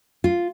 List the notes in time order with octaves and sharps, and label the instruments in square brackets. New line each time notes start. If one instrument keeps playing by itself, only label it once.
[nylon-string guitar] F4